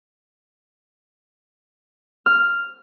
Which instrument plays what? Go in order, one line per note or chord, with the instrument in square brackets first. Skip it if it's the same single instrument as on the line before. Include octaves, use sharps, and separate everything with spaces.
[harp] F6